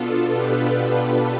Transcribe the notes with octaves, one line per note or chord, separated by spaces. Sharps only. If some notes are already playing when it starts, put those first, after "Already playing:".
Already playing: B2 B3 D4 F4 A4
G4 B4
G4 B4